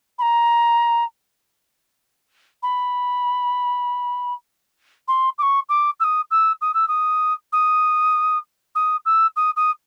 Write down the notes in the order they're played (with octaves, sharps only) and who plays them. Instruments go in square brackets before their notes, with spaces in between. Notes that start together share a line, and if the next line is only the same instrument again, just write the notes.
[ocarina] B5
A#5
B5
C6
D6
C#6
D6
E6
D#6
E6
D#6
E6
D#6
D#6
D#6
E6
D#6
D#6